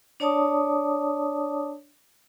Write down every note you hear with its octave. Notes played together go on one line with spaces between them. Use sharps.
D4 C#5 D5 A5 D6 D#6